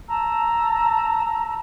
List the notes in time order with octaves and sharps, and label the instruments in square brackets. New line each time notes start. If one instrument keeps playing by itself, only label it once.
[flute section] A5 A#5 E6